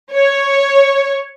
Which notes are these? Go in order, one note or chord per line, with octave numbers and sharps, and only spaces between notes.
C#5